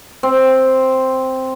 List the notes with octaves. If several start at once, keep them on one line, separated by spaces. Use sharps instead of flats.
C4